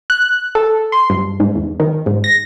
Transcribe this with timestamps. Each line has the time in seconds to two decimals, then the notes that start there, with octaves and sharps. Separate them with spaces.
0.10 F#6
0.55 A4
0.92 C6
1.10 G2
1.40 G#2
1.55 E2
1.80 D#3
2.06 G#2
2.24 A#6